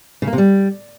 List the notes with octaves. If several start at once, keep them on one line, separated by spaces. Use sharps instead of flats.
C#3
A#3
C3
G3